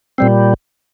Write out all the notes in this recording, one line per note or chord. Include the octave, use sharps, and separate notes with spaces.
A#2 G3 C4